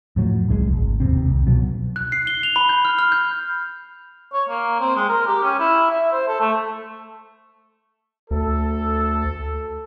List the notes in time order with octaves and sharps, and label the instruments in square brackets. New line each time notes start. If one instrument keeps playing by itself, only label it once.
[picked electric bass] F2 A2 F#3
D1 C2 B2 G#3
G#1
E1 D#2 C3 C4
C2
B2 F#3
[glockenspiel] F#6
C7
G7
F7
B5
G6
F6
F6
G6
[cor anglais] C#5
A#3
C4
G#3
A#4
G4
C#4
E4
E5
C5
A4
A3
[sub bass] D2 [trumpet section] A4